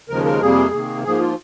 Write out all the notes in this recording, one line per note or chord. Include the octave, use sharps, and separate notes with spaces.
D#2 C#3 F3 G#3 A#4
A#4
F2 C3 G3 A#3 G#4
C3 D#3 A#3
G#2 F3 A#3 G#4
F4